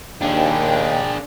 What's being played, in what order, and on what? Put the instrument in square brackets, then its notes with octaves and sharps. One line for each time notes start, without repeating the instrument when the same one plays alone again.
[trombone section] D#2 [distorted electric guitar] D4 G#4 [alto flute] G5